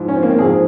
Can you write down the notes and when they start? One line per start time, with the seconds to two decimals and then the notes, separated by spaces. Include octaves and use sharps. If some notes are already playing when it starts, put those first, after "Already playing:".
Already playing: G#2 F3
0.08 C#4
0.16 C4
0.23 A#3
0.30 C4
0.39 G#2 F3 G#4